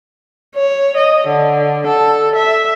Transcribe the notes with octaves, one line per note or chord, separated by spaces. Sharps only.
C#5
D#5
D3
A4
E5